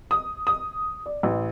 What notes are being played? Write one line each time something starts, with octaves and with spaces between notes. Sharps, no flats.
D#6
D#6
D5
A1